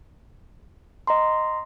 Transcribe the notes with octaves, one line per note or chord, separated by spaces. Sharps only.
D#5 A#5 C6